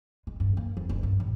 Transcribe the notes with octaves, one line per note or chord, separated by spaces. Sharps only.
G#3
G2
A#3
F2
F#1
G2
A1